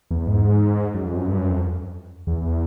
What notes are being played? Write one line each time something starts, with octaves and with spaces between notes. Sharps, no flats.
E2
G#2
F#2
F2
F#2
G2
F#2
F2
E2